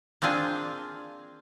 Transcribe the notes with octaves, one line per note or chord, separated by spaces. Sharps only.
A#3 C4 D4 F4 G#4